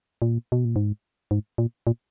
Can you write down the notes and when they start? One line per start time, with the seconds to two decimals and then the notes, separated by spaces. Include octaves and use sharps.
0.22 A#2
0.52 B2
0.65 A#2
0.76 G#2
1.31 G#2
1.58 A#2
1.87 A#2